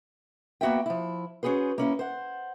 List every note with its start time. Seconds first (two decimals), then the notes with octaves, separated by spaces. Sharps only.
0.61 A#3 B3 F#4 E5 G5
0.86 F3 E4
1.43 C#4 F#4 G#4 B4 C5
1.78 A#3 C#4 E4
1.99 C5 F#5